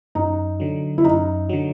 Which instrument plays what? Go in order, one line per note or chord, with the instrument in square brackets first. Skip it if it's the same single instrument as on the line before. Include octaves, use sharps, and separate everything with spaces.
[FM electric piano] F#2 [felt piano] D#4
[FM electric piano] D3 F#3
[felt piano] E4
[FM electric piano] F#2 [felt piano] D#4
[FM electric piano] D3 F#3